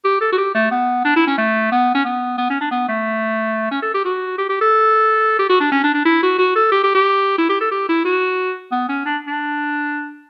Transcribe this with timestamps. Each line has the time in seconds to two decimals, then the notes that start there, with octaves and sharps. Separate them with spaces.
0.04 G4
0.21 A4
0.32 F#4
0.38 G4
0.54 A3
0.71 B3
1.05 D4
1.16 E4
1.27 C#4
1.38 A3
1.72 B3
1.95 C#4
2.05 B3
2.38 B3
2.50 C#4
2.61 D4
2.71 B3
2.88 A3
3.71 C#4
3.82 A4
3.94 G4
4.05 F#4
4.38 G4
4.49 G4
4.61 A4
5.39 G4
5.49 F#4
5.60 D4
5.72 C#4
5.84 D4
5.94 D4
6.05 E4
6.22 F#4
6.38 F#4
6.55 A4
6.72 G4
6.84 G4
6.95 G4
7.38 E4
7.49 G4
7.60 A4
7.71 G4
7.89 E4
8.05 F#4
8.72 B3
8.89 C#4
9.05 D4
9.27 D4